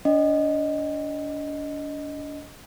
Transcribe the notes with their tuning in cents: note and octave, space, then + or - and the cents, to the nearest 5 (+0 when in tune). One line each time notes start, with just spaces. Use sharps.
D4 -35 D#5 +0